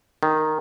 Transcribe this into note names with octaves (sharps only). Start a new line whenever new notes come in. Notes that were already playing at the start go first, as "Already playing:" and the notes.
D#3